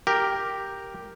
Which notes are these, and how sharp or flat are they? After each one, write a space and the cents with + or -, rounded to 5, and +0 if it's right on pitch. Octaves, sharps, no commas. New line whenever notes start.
G4 +0 A#4 +0